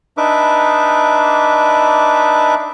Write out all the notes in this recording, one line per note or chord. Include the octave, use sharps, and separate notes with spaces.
D4 D#4 B4 E5 D6